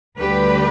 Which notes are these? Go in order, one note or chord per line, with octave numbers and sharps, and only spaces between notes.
D2 D3 G3 G4 B4